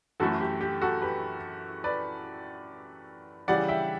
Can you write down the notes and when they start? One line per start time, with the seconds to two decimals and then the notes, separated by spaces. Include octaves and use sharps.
0.20 F#2 E3 A3 E4 F#4 A4
0.41 G4
0.61 G4
0.82 F#4 A4
1.02 G4 B4
1.84 B4 D5
3.48 C#3 E3 G3 D5 F#5
3.68 E5 G5